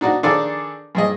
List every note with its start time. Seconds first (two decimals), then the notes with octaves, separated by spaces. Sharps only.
0.01 D4 D#4 F#4 D5
0.23 D#3 D4 G#4 A4 D5 D6
0.95 G2 G#4 D#5